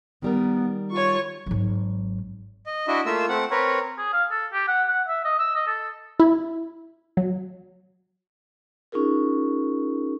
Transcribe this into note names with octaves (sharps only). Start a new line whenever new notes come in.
D#3 G3 B3 A#4
F4 C#5 C#6
G#1 F#3
D#5
D4 E4 F#4 D#5 E5
A3 A#3 F4 E5 E6
A3 C4 F#5
C4 A#4 B4 C#5
G#4
F5
A4
G4
F#5
F#5
E5
D#5
E6
D#5
A4
E4
F#3
C#4 D#4 F4 G#4 A#4